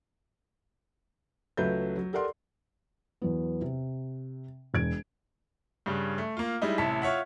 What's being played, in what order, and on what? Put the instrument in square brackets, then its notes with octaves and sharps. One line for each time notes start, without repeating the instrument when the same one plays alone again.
[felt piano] C#2 F#3 A3 B4 E5 G6
F#3
G4 A4 A#4 D5 F#5 C6
E2 F#3 B3
C3
E1 G#6 D7
[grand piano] G2 C#3 G3
A3
A#3 F4
G3 G#3 D#4 E4
A1 C3 E4 A5 B6
F4 C#5 E5 F#5